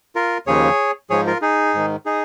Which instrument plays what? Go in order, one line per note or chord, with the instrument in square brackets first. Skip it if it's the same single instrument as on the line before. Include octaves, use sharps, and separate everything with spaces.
[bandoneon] F4 A#4
D#2 C#3 F3 G#4 C#5
G#2 F3 G#4 C#5
F4 A#4
D#4 G#4
G#2 D#3
D#4 G#4